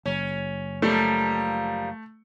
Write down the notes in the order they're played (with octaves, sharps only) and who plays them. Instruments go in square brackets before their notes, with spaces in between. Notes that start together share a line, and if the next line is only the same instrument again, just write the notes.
[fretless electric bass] F#1 [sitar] C#4
[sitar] F3 G3 A#3 [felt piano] A3